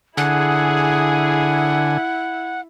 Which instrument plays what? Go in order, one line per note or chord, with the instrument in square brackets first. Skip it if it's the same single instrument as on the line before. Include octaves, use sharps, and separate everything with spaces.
[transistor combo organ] D3 G#5 [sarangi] E4 [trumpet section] G#4 [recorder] F#5